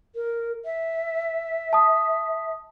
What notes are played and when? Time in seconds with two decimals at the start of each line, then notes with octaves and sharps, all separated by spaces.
0.15 A#4
0.65 E5
1.73 A5 D#6